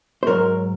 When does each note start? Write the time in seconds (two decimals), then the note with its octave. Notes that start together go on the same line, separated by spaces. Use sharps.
0.23 C5
0.27 G#2 F#3 A#4 C#5